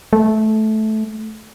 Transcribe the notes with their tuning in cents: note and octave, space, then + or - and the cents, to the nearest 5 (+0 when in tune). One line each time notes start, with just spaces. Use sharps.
A3 -15